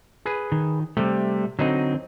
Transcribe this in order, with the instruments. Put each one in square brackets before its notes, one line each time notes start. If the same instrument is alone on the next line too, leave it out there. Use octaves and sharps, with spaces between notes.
[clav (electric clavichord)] G#4 B4
[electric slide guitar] D#3
[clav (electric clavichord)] C3 [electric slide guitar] G3 A3
[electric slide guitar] D3 C4 [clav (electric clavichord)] F#3 D#4 D#5